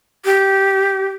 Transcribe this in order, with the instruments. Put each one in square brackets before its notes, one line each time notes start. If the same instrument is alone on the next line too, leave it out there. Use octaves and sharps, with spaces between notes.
[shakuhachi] G4